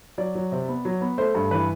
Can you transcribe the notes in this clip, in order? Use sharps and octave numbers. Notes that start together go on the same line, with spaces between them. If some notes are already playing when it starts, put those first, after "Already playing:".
F#3 D5
F#3
C3
B3
F#3
B3
A3 C5
G2
E3 B4